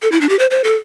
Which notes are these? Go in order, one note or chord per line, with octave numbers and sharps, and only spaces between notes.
A4
E4
D4
G4
C5
C5
A4